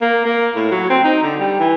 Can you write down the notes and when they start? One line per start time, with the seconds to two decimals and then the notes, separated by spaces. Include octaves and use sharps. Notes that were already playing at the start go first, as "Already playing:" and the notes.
0.02 A#3
0.25 A#3
0.55 A2
0.71 F#3
0.90 C4
1.04 D#4
1.23 D3
1.40 G3
1.60 E3